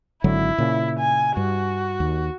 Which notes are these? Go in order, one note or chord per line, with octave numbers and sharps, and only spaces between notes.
G#1 D3 F#3 E4
A#2 C#3
G#5
G2 F#4
D#2